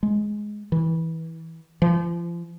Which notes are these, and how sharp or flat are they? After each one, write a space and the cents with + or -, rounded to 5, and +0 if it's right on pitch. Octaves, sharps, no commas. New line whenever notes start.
G#3 +10
E3 -20
F3 -35